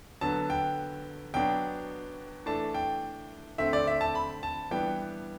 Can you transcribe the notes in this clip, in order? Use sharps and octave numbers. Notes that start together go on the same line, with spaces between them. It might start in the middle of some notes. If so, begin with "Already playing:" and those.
D3 F#3 B3 A5
G5
B2 F#3 B3 D4 G5
E3 A3 D4 A5
G5
D3 A3 C4 E5
D5
E5
A5
B5
A5
E3 G3 B3 D4 G5